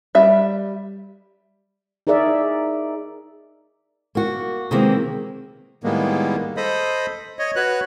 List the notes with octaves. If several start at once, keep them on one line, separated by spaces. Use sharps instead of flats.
G3 E5
D#4 G#4 A#4 D5 E5
A#3 F#4
C3 D#3 E3 G#3 A#3 C4
A2 D#3 G3 G#3 A#3 B3
A4 C5 D#5 B5 D#6
C#5 D#5
F#4 B4 C#5 F#6